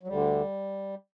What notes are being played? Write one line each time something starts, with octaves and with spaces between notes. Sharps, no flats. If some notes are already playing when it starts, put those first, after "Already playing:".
F#3
D2 D3 G3